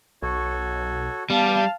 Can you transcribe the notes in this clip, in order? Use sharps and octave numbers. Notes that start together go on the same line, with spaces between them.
B1 F#4 A4 C#5
G3 B3 F5 A5